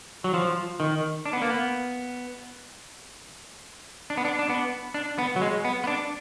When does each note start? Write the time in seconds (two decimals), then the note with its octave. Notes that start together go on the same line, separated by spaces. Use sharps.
0.24 F#3
0.34 F3
0.80 D#3
1.26 D4
1.33 B3
1.42 A#3
1.50 B3
4.10 D4
4.17 B3
4.25 D4
4.39 D4
4.49 B3
4.94 D4
5.18 B3
5.36 F#3
5.41 G#3
5.65 B3
5.84 B3
5.87 D4